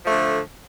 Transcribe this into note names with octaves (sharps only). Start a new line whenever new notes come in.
D3 F3 A3